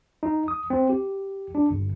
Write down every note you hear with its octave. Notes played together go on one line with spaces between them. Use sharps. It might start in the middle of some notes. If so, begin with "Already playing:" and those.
D#4
D#6
C4
G4
D4
G1